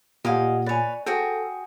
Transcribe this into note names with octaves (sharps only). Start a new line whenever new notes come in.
A#2 G4 D#5 F5 F#5 G#5
B4 C#5 D5 G#5
F#4 G#4 A4 C5 G5